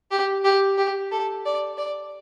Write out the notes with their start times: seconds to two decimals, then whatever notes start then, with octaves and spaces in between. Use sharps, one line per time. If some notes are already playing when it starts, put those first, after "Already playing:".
0.11 G4
0.44 G4
0.78 G4
1.11 A4
1.46 D5
1.78 D5